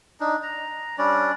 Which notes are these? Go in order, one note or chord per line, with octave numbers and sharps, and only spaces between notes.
D4 D#4
A#5
G3 C#4 D4 D5